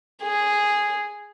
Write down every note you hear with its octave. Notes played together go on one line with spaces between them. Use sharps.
G#4